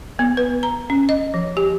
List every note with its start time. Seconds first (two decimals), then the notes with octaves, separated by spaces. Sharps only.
0.19 B3
0.37 B4
0.63 A#5
0.90 C#4
1.09 D#5
1.34 F3
1.57 G4